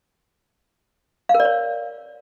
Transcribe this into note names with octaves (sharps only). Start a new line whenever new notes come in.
F5
A#4
D5
C#5